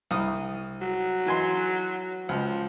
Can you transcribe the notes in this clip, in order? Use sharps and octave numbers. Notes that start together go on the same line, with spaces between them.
C2 D#6
F#3
E3 G#5 C6
C#2 F3